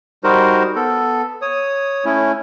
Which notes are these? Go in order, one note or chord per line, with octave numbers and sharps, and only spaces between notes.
G3 D#4 F#4 A#4 C5
B3 A4
C#5 D#6
A3 C#4 E4